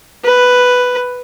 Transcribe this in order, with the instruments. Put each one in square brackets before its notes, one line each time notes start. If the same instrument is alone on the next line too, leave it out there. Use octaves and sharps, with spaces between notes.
[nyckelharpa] B4